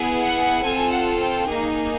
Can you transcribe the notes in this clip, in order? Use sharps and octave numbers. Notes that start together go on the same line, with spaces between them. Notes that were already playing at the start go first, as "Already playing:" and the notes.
Already playing: B3 E4 G#4
F#5
C4 F4 A4 G#5
F#5
G5
A#3 D#4 G#4